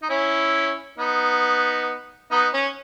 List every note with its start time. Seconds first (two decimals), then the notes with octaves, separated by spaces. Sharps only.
0.02 D#4
0.10 C#4 E4
0.98 B3 D#4
2.31 B3 D#4
2.54 C#4